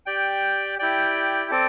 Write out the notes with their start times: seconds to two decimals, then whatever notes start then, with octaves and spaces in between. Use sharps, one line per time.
0.06 G4 D5 G5
0.79 E4 G4 D5 G5
1.51 C4 A4 D5 G5